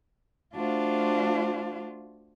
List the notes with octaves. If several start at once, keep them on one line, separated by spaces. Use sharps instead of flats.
A3 D4 F4 F#4 C5 F5